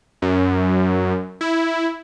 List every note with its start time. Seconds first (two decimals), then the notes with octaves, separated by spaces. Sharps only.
0.22 F#2
1.41 E4